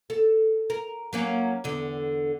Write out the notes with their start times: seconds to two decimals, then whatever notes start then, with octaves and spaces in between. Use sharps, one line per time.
0.10 A4
0.70 A#4
1.13 F#3 A#3 C#4
1.64 E2 D3